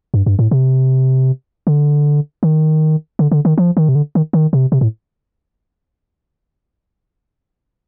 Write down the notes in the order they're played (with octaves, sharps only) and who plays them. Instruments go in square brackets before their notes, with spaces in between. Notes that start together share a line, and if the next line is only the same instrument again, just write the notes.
[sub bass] G2
G2
A2
C3
D3
D#3
D3
D3
D#3
F3
D#3
C3
D3
D#3
D#3
C3
C3
A2